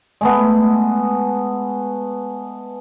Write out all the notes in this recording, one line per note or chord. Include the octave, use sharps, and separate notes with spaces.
G#3 A3 B3